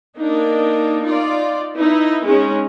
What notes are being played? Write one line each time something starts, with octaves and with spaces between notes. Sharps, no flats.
A#3 D4 D#4
D#4 F4 D5
D#4 E4 B4
G#3 C#4 D#4